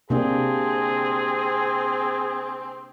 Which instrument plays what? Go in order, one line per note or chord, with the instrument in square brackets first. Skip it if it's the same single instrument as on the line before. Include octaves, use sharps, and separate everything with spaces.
[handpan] C3 A#3 D4 [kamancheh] C4 [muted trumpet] G#4